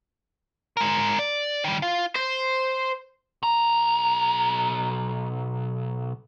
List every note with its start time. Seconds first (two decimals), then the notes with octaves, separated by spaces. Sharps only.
0.77 G#3 A#4
1.19 D5
1.64 D#3 G3
1.82 F4
2.15 C5
3.43 B1 A#5